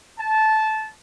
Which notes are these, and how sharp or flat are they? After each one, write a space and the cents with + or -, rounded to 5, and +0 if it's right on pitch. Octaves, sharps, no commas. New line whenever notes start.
A5 -15